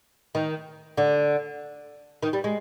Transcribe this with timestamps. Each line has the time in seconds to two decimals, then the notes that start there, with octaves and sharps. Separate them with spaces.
0.35 D#3
0.97 D3
2.23 D#3
2.33 G3
2.44 G#3